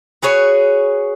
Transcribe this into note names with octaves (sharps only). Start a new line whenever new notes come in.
F#4 G#4 B4 C#5